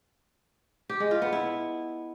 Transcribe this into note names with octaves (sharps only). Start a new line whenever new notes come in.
G4
G#3
F4
B3
E4